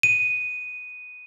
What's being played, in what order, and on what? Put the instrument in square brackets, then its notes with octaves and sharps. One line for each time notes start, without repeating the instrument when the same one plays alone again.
[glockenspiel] D#7